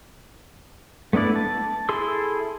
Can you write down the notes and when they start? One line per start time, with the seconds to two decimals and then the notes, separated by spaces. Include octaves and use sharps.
1.13 A3 B3 D4 E4 D5
1.36 A5
1.89 E4 G#4 A4 C6 E6